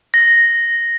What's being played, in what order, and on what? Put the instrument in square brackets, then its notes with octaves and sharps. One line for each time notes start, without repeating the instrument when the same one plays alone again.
[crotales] A#6